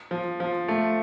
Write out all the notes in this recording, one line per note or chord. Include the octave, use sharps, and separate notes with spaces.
F3
F3
A3